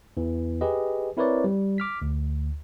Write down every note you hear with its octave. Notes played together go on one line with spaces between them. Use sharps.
E2 E3
G4 G#4 B4 D#5
C4 E4 A#4 B4 C#5 D5
G3
D6 F6 B6
D2